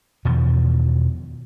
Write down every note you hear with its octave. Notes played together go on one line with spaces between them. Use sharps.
E2 B2 D#3 F3